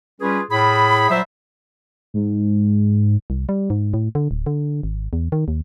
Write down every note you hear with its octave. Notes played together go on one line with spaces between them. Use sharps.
G3 C#4 F4 G#4 B4
A2 G#4 B5
A#2 F#3 G3 C5 E5
G#2
C2
G3
G#2
A2
D3
D1
D3
G#1
E2
D#3
D#2